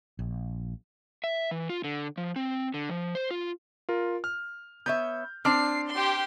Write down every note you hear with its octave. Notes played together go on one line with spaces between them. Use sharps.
A#1
E5
E3
F4
D3
F3
C4
D3
F3
C5
F4
F4 A#4
F6
B3 C#5 E5 G6
C4 D4 A5 D6 F6 C7
G4 C6